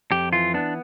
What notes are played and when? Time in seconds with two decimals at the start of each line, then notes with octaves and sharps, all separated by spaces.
0.12 F2 G4
0.33 E3 F4
0.54 B3 D4